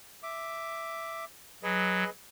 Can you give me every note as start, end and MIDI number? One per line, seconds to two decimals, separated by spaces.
0.23 1.25 76
0.23 1.25 86
1.63 2.04 54
1.63 2.10 68
1.63 2.10 71
1.63 2.10 75